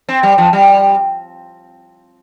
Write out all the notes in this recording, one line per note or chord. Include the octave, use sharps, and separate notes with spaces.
C4
G3
F3
G3